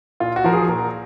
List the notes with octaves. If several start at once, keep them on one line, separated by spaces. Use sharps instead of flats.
A#2 F4
F#4
F3 A#4
G#4
A#2 A#4